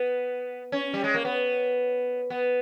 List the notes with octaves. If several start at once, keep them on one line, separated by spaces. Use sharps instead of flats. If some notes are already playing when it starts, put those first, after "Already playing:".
Already playing: B3
C#4
G3
G#3
A#3
B3
B3